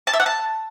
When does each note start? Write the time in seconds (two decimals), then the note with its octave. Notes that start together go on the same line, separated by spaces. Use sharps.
0.07 A5
0.13 E5
0.20 F#5
0.26 A5